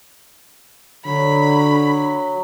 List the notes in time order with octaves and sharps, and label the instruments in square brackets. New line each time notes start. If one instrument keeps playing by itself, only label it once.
[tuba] D3 [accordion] F#3 [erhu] B5